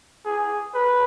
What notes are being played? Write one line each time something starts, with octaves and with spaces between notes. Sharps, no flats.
G#4
B4